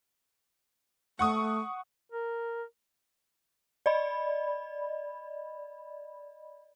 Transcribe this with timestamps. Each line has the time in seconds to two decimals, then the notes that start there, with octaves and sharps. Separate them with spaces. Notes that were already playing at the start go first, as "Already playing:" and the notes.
1.19 A3 F#5 C#6 D#6
2.12 A#4
3.86 D5 D#5 B5